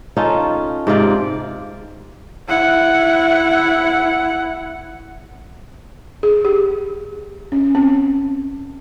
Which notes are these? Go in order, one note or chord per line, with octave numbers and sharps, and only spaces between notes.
C#4 D#4 F4 A4
G#2 C3 F4 D5
E4 F#5
G#4
G4
C#4
C4